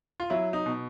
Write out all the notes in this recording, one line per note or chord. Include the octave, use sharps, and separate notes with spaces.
F4
F#3 E4
D#4
B2